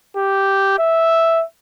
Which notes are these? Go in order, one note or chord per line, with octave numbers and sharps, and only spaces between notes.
G4
E5